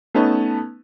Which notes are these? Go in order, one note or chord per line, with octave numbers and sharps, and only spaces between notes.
A3 B3 C#4 D#4 A5